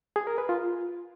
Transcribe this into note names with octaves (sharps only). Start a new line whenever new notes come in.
G#4
A#4
B4
F4